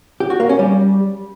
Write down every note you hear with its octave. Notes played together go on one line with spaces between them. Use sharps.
G4
F#4
A#3
C#4
G3